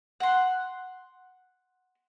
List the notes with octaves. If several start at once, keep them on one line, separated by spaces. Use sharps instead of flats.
F#5 C6